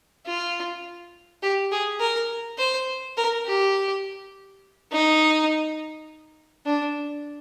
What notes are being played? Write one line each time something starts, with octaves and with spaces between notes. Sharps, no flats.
F4
G4
G#4
A#4
C5
A#4
G4
D#4
D4